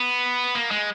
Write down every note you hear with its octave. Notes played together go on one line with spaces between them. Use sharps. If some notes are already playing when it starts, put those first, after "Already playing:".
Already playing: B3
A#3
G#3